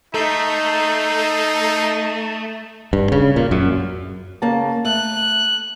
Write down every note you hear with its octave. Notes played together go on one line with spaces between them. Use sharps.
A3 D#4 A4 A#5 G6 C7
G2
C#3
A#2
F#2
C#3 A#3 A5
A3 F#6